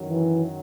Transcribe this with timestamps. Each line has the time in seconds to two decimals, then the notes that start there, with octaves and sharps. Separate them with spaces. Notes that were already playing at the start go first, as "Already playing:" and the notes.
Already playing: F#2 D#3 F#3
0.09 E3